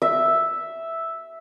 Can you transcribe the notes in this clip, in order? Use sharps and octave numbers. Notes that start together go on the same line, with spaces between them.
E5